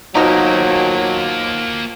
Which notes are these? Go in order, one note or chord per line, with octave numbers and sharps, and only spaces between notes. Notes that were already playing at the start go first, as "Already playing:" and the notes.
B2 F3 F#3 A#3 D#4 G4